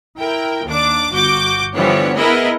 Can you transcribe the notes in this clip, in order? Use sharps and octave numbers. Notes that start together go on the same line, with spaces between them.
E4 A#4 G5
D#2 D4 D6
G1 F#4 D6 G6
D3 E3 F3 G3 B3 C#5
B3 E4 G#4 A#4 B4 D#5